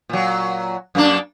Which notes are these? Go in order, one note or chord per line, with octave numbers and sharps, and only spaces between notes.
A#2 F#3
F#2 A#3 D4